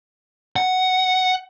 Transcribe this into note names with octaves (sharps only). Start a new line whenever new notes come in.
F#5